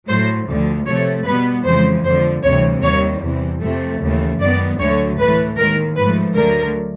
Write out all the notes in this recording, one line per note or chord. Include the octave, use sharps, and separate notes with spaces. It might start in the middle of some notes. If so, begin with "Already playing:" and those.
A2 F#3 A3 C5
D2 D3 F3
C3 F3 A3 C#5
B2 G3 B3 B4
F2 C#3 E3 G#3 C5
F2 D3 F3 C5
D2 C3 E3 G3 C#5
D#2 D#3 G3 C#5
E2 C3 E3
F2 C3 F3 A3
D#2 C#3 E3 A3
F#2 D#3 G#3 B3 D5
D2 D3 F#3 A3 C#5
A2 E3 A3 B4
D#2 D#3 G#3 A#4
G#2 F3 A3 B4
D2 D3 F#3 A3 A#4